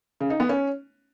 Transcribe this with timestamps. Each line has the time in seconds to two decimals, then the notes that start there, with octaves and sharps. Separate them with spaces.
0.21 C#3
0.30 D#4
0.40 B3
0.49 C#4